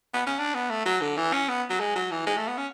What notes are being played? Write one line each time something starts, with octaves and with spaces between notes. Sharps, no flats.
B3
C#4
D4
B3
A3
F#3
D3
E3
C#4
B3
F#3
G#3
F#3
E3
G#3
A3
B3
C#4